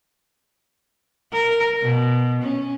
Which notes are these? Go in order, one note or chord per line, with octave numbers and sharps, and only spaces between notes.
A#4
B2
C#4